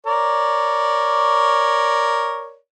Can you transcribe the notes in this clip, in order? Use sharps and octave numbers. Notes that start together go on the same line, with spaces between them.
A#4 C#5 D5